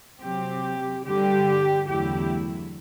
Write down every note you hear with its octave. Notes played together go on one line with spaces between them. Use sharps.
C3 F#3 C4 G4
G2 D3 G3 G4
E2 D3 F#3 A3 E4 G4